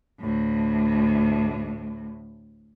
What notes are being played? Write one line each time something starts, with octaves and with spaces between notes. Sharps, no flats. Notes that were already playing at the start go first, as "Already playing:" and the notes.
D2 A2